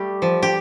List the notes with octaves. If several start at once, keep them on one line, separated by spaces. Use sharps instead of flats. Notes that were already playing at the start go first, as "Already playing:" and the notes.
Already playing: G3 A3 G4
F3
G4